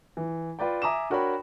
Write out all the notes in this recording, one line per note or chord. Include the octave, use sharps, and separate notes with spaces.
E3
F4 B4 D5 G5
E5 G#5 A#5 D6 D#6 E7
D4 F#4 A#4 C#5 G5 B5